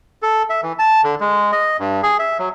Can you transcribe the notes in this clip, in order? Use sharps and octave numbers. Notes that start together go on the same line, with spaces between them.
A4
E5
E3
A5
D3
G#3
D#5
G2
G#4
E5
F#3